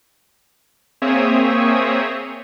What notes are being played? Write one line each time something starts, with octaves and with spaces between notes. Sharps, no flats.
A#3 C4 G#4 C#5 E5 D#6